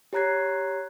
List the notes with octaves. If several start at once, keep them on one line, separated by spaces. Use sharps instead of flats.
G4 C#5 A#5 F#6 G#6 C7